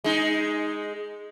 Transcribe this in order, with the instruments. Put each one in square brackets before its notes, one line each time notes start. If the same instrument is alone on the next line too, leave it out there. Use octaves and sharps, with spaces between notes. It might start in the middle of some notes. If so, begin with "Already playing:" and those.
[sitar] G#3 D#4